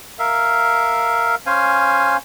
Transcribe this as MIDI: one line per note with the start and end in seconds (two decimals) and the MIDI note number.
0.19 1.35 70
0.19 1.35 76
0.19 1.35 77
1.46 2.17 61
1.46 2.17 72
1.46 2.17 77
1.46 2.17 80